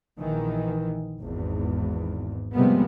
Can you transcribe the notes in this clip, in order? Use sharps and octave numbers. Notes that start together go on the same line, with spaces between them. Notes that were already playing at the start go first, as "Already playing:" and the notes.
A#1 D#3 E3
G#1 E2
C3 F3 G3 G#3 A#3 B3